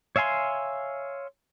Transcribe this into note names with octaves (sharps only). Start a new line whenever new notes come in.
C#5 E5 F5 G#5 C6